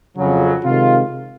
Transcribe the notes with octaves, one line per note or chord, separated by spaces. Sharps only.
F2 C#3 F#3
C3 D#3 G#3 F4